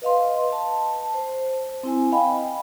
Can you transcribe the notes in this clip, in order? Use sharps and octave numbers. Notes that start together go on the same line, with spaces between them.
B4 D#5 F5 C6
A5
C5
C4 E4 G#5
D#5 F5 G5 G#5 B5